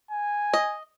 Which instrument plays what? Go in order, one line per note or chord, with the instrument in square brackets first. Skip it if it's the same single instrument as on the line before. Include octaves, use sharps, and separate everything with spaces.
[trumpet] G#5
[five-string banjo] D#5